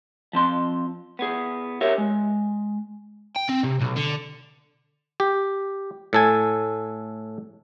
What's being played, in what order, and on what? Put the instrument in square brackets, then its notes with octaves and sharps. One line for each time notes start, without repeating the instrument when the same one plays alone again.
[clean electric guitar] F3 C4 C6
B3 G#4
G4 A#4 C#5 E5
G#3
[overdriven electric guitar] G5
C4
C3
B1
D3
[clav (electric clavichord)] G4
A2 A4 G#5